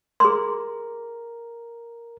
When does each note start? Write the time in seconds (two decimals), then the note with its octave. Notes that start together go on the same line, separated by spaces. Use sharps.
0.20 G#4 A#4 C6